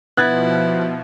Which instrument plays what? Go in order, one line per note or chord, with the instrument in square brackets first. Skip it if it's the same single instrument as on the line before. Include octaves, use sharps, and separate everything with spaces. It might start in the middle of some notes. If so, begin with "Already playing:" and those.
[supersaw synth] B2 F3 [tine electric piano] B3 [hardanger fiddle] E4 [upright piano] F#6 G#6 A6